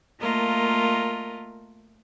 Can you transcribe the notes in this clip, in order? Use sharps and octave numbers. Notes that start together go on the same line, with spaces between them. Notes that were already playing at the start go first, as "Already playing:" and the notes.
A3 A#3 F4 A#4 D#5